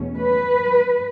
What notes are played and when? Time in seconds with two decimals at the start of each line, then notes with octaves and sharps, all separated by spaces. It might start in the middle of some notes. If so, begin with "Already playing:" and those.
Already playing: E2 B2 A3 C#4
0.17 B4